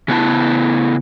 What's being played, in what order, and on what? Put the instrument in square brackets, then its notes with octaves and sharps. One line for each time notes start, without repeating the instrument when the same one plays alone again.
[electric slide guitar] C#3 B3 E4 A5